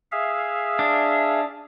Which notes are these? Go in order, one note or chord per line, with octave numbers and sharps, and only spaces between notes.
G#4 E5 F5
D4